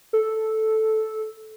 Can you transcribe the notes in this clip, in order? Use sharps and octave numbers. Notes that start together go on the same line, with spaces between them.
A4